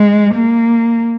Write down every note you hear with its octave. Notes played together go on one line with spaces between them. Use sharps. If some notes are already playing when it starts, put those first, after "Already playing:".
Already playing: G#3
A#3